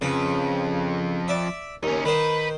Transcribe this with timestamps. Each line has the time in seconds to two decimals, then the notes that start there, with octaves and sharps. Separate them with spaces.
0.01 F2 C#3 B4
1.28 D5 E5
1.83 D#2 C#4 D#4
2.05 D#3 D#4 B4 C5